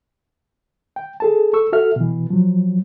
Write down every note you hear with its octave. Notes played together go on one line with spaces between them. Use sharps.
G5
G#4 A4 A5
A4 C#6 E6
F#4 A4 E5 F6
B2 E3
F3 F#3